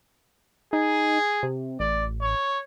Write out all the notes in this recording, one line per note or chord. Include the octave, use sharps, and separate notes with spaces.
D#4 G#4
C3
A1 D5
C#5